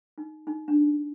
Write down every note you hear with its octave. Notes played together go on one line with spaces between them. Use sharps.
D#4
D#4
D4